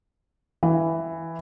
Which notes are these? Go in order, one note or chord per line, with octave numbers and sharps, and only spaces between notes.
E3